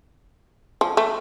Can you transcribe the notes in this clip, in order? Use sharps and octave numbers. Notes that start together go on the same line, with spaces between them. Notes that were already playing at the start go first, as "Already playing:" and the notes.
F3
A3